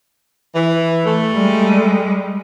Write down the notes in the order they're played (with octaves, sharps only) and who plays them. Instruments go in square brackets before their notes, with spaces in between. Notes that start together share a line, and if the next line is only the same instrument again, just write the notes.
[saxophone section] E3
A3
[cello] G3 G#3